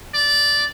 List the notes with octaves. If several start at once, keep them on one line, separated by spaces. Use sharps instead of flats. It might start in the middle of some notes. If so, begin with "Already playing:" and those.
D5